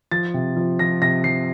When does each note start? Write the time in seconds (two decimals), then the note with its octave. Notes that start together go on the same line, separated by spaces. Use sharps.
0.11 F3 A6
0.34 C3
0.56 F3
0.79 F3 A#6
1.01 C3 A#6
1.24 F3 C7